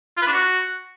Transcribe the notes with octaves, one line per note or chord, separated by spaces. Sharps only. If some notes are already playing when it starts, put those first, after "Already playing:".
F4
B4
D4
F#4